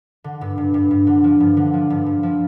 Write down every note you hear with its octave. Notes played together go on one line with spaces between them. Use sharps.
D3
G2
G2
G2
G2
D3
F3
G2
D3
F3
G2
G2
F3